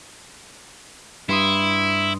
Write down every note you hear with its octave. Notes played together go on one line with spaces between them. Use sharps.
G2 E4 C6 D#6